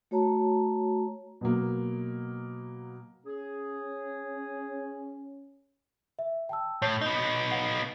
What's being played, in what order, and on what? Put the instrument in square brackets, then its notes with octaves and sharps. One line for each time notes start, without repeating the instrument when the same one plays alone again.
[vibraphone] A3 F#4 C#5 A5 A#5
[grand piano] B2 F#3 A#3
[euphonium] C#4 [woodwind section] G#4
[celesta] E5
G5 A5 E6
[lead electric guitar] A2 [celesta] C#5 G6 C7
[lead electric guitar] B3 D#4
[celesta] F5 F#5 C7